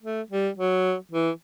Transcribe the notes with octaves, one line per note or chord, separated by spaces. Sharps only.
A3
G3
F#3
E3